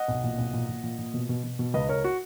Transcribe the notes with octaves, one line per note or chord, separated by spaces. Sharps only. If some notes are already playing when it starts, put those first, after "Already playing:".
Already playing: D#5 F#5
B1
A#2
B1
A#2
A#2
A#2
A#2
B2
B2
B2
B2
C#2 B4 D#5
C#2 A#4 C#5
F#4